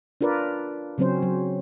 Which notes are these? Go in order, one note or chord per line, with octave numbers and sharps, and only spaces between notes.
D4 F4 A#4 B4 D5
C#3 F#3 C4 C#4 C5
F#3